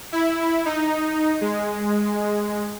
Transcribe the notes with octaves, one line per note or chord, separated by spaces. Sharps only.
E4
D#4
G#3